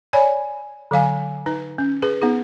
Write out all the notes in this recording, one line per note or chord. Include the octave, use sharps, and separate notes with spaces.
C#5 D5 G#5 B5
D3 F#3 F5 G#5
D#4 B4
C#4
G#4 B4
B3 D#4 G#4